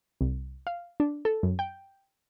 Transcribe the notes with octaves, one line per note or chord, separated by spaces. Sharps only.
C2
F5
D4
A4
F#2
G5